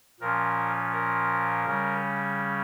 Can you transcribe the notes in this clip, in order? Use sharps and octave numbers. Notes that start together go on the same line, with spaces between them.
A#2 F3 C#4 A#4
A#4
C#3 G3 C#4